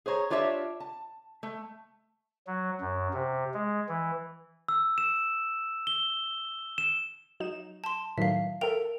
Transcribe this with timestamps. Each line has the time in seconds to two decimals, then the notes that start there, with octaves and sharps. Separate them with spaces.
0.06 G#4 C5 C#5 A#5
0.30 D4 F4 G4 C#5 D5 E5
0.80 A5
1.43 A3
2.47 F#3
2.81 F#2
3.14 C3
3.54 G#3
3.88 E3
4.68 E6
4.98 E7
5.87 G7
6.78 E7
7.40 F#3 D#4 E7
7.84 A5 C6
8.18 A2 D#3 F#3 E5 F5
8.61 A4 A#4 E5 G5 F7